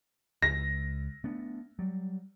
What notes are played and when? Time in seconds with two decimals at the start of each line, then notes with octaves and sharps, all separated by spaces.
0.42 C#2 A#6
1.24 A3 B3 D4
1.79 F#3 G3